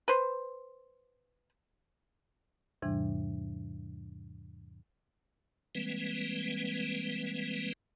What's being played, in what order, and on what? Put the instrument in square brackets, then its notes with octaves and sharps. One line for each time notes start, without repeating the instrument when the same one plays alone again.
[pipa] B4 C5
[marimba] E2 G#2 C3 E3 G3 D4
[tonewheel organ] E3 G3 G#3 A#3 C4 B4